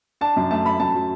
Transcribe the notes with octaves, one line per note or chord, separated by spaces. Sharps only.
D4 A5
F#2
A3 A5
A3 B5
F#2 A5
F#3